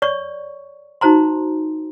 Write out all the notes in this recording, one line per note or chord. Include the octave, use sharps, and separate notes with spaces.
C#5 D5 C#6
D#4 F#4 C5 A#5 C6